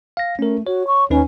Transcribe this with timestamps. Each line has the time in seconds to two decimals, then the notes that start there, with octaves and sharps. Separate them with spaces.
0.17 F5 A#6
0.39 A3 C#4 A#4
0.67 F#4 C#5
0.87 C#6
1.10 D#2 C#4 D#4 B4